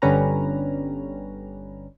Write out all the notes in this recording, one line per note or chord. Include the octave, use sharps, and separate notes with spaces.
G1 D3 G3 C#4 B4 A#5